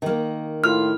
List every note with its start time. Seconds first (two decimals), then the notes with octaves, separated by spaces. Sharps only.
0.02 D#3 A#3
0.64 A2 F4 F6